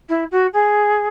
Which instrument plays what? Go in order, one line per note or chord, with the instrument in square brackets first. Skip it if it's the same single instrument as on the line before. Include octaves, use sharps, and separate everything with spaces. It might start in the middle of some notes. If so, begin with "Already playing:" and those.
[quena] E4
F#4
G#4